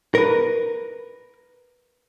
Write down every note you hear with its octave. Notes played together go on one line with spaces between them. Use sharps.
A#4 B4